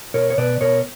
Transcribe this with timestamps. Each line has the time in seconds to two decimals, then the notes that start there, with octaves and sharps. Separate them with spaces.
0.14 B2 A#4 C#5
0.30 C#5
0.38 B2 B4 D5
0.61 B2 A#4 C#5